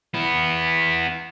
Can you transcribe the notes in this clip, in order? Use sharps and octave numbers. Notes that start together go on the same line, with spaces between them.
B3 E4